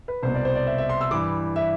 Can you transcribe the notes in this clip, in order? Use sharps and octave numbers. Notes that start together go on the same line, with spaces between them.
B4
C2 B2 C5
D5
C5
D5
E5
E5
C6
E6
G2 E3 D6
E5